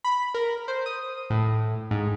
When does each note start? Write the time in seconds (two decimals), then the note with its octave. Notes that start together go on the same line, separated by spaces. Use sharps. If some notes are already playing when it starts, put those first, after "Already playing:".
0.04 B5
0.34 A#4
0.68 C5
0.86 D#6
1.30 A2
1.91 G#2